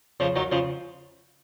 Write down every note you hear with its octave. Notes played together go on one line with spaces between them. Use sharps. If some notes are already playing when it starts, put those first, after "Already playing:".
C#3 F3
D#3 F#3
C#3 F3